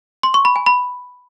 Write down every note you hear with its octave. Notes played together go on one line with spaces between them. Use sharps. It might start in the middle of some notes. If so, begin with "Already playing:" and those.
C6
C#6
B5
G#5
B5